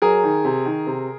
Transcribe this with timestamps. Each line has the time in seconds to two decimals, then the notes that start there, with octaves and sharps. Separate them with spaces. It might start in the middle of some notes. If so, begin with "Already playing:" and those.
0.02 F#3 G#4 A#4
0.24 D#3
0.44 C3
0.66 D#3
0.87 C3